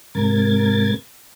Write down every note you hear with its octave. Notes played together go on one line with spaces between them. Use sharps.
G#2 C3 A#4 G#6 A6